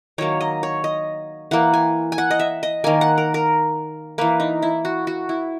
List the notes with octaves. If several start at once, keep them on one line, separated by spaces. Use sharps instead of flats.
D#3 F#3 A#3 C#5
D#5
C#5
D#5
E3 A#3 F#5
G#5
G#5
F#5
D#5
E5
D#5
D#3 A#3 G#5
F#5
A#4
A#4
E3 A#3 B4
D#4
E4
F#4
F#4
E4